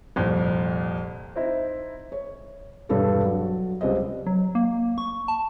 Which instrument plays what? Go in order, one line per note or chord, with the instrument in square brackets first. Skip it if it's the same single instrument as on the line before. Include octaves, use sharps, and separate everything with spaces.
[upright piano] C2 F2 A#2
C4 D#4 E4
[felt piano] C#5
E1 G2 G3 A4 C#5
F#3
C#2 G3 C4 D#5
[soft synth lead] F#3
A#3
C#6
A5